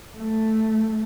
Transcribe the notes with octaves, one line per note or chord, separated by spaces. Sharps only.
A3